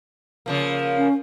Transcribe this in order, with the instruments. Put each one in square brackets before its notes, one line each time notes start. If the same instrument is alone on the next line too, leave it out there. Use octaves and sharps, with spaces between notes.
[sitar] C#3 F3 A#3
[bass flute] C#4